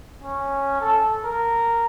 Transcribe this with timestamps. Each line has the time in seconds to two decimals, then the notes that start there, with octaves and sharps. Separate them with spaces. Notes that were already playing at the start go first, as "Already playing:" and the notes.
0.23 C#4
0.81 A4
1.24 A#4